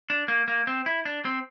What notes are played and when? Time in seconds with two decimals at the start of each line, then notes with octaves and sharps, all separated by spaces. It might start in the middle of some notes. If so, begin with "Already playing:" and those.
0.10 D4
0.28 A#3
0.48 A#3
0.67 C4
0.86 E4
1.05 D4
1.25 C4